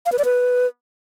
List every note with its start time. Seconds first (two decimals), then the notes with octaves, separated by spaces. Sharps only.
0.06 F5
0.12 B4
0.19 D5
0.25 B4